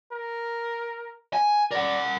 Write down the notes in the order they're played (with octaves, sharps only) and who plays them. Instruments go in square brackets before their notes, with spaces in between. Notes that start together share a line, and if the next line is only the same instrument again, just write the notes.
[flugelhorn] A#4
[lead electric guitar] G#5
[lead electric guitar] A#4 F#5 [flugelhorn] D5